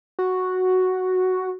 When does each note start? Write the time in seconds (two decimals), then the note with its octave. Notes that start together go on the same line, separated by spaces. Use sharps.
0.19 F#4